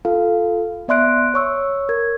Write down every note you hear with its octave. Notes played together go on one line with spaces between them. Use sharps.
F4 A4 F5
B3 D5 E5 C6 F#6 D7
C#5 C#6 E6
A#4 G#6